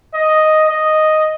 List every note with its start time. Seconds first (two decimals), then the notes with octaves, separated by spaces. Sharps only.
0.14 D#5
0.69 D#5